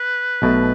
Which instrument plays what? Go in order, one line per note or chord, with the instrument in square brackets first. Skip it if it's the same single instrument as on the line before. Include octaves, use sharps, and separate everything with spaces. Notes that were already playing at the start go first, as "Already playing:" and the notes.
Already playing: [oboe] B4
[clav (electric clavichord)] B1 B2 A3